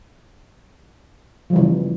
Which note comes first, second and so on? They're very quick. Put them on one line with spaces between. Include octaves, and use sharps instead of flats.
F3 G3 E3 C#3